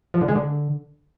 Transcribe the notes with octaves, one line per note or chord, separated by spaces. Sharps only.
F3
D3
G#3
D3